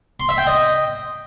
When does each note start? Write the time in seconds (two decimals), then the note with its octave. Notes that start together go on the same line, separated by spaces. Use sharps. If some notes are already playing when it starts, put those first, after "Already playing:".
0.20 C6
0.29 E5
0.38 G5
0.47 D#5